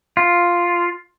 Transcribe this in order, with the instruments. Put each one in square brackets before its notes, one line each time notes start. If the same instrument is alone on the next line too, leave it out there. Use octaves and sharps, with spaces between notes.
[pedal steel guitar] F4